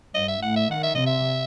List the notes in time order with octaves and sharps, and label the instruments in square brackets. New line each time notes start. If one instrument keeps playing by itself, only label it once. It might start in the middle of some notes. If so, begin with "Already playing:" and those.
[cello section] G2 [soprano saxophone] D#5
[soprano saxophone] E5
[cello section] A2 [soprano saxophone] F#5
[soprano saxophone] E5
[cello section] D#3 [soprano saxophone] F#5
[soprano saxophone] E5
[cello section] C3 [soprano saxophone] D#5
[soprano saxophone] E5